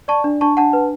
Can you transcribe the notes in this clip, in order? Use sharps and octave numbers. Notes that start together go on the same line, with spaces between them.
D5 A5 C#6
D4
D4 A5 C#6
D4 F#5 A5
B4